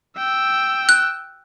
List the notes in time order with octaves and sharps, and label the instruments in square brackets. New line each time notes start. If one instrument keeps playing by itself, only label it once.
[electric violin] G5 E6
[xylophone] F#6